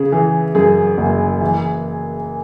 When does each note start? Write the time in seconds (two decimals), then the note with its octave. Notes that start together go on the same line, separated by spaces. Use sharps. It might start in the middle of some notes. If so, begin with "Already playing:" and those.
Already playing: C#3 G#4
0.12 E3 G#4
0.55 F#2 G#4
0.98 F#1
1.41 E3